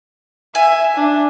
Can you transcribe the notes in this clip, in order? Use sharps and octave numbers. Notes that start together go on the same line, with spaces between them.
E5 G#5
D4